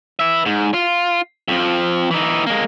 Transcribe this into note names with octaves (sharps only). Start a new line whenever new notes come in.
B4 E5
G#2
F4
F2 F3
E3 D#4
G#3 A#3